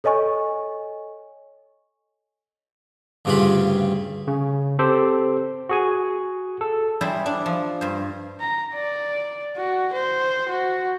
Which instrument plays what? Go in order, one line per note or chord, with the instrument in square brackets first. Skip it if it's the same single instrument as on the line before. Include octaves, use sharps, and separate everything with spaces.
[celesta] A4 C#5 D#5 G#5 C#6
[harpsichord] D2 G2 C#3 G3 F4 B5
[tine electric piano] C#3
C4 G4 A4 C5
F#4 G#4 G#5
A4
[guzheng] G3 E4 G#4 C5
D4
F3
G2 C5
[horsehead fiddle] A#5
D5
F#4
C5
F#4